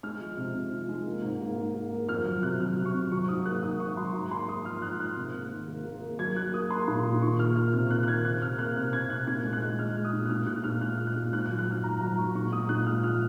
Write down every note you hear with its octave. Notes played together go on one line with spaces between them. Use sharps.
G#3 F6
F3
C3
C3
F3
G#3
A#3
G#2
A#3
G#2
A#3
A#3
F2 F6
F#3 F6
C3 F#6
F#3 F6
C3
C#6
C3
F#3 C#6
G#2 D#6
A#3 F#6
G#2 D#6
A#3 C#6
F#3 C6
G#2 A#5
A#3 C6
A#3 D#6
F3 F6
G#2 F#6
G#2 F#6
C3
A#3
D#3
A#3
A#3
A#3
F#3 G#6
A#3 F#6
A#3 D#6
A#3 C6
A#2 C6
A#2
D#3 C#6
A#3 F6
A#3 F6
C3 F6
A#3 F#6
F#6
D#3 G#6
C3 F#6
C3 F6
A#3 F#6
C3 F#6
C3 G#6
C3 F#6
A#2 G#6
G#3
F#6
G#3
G#3 F6
G#3
D#6
A#2
F#6
A#2 F6
A#2 F#6
A#2 F6
G#3 F#6
G#3
F#6
A#2
G#2 F#6
F#6
F#3
F#6
G#2 F6
G#2 A#5
F#3 A#5
G#2 C#6
A#2 C#6
G#3 D#6
A#2 F#6
G#3 F6
F3 F6